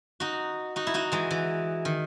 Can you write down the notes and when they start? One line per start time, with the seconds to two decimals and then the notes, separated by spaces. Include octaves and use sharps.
0.20 D#4 F#4
0.76 D#4 F#4
0.87 E4
0.94 D#4 F#4
1.12 E3 G#3
1.31 E3
1.85 D#3